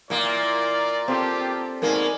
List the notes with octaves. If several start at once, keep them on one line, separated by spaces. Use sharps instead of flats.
A#2 E3 A#3 F4 A#4 D5
C4 D4 F4 G4 A4
G#2 B2 A#3 A#4 D5 G#5